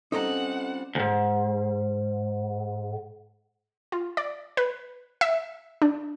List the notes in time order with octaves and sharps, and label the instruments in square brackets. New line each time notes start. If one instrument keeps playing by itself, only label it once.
[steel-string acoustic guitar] G3 C4 F4 [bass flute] C#4 [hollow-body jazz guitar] D#4 A4 A#5 [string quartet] F#5
[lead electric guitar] D2 G#2
[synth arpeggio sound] F4
D5
B4
E5
D4